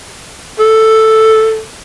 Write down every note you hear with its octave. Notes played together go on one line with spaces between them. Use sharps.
A4